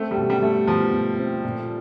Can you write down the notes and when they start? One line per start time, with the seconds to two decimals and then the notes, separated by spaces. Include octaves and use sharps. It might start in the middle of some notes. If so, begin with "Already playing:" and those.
Already playing: A3 C4
0.11 G3
0.17 B2
0.30 G3
0.43 A3
0.67 B2 F3
0.93 B2
1.19 C4
1.44 A#2